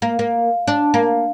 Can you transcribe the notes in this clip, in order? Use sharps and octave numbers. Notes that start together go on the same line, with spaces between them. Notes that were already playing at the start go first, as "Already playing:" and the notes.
A#3
A#3
D4
A#3